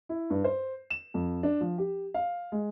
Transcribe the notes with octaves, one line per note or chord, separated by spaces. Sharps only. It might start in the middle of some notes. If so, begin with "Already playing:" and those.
E4
G2
C5
E7
F2
D4
F3
G4
F5
G#3